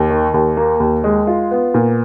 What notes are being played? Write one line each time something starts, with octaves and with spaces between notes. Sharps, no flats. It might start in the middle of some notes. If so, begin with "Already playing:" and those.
Already playing: D#2
D#3
D#2
A#3
D#2
G#3
F4
B3
A#2